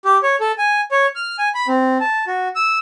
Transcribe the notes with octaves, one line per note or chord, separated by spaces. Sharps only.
G4
C#5
A4
G#5
C#5
F6
G#5
B5
C4
A5
F#4
E6